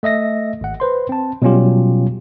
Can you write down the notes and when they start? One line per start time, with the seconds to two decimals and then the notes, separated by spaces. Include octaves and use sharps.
0.03 A3 D#5 E5 A#6
0.61 G#1 F#5
0.80 B4 C5 C6
1.09 C4 A5
1.42 B2 F#3 G3 C#4 F4 G4